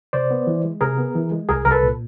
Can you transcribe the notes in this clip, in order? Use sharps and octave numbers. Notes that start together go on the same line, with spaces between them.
C3 C5 D5
B3
E3
G#3
C3 G#4 A#4
B3
E3
G#3
C2 G#4 A#4
C2 A#4
A4 B4
A#2